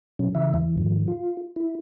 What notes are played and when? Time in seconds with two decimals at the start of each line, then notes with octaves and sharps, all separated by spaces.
0.19 B2 F#3 C#4
0.35 C#3 E3 E5
0.54 E2 E3
0.78 G#2 D#3 F3
1.08 F4
1.56 E4